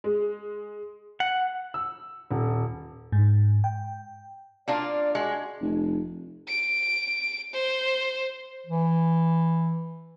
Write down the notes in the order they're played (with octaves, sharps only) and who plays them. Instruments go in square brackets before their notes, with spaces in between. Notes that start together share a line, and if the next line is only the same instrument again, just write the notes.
[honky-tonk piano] G#3
[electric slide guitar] F#5
[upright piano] E6
D#1
[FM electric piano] G#2
G5
[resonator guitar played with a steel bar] A#3 D4 F4 [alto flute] D5
[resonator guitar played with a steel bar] G#3 [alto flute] F#4
[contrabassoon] F1
[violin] D7
C5
[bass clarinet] E3